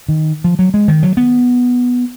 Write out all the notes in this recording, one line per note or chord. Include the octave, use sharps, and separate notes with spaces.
D#3
F3
F#3
G#3
D#3
F#3
B3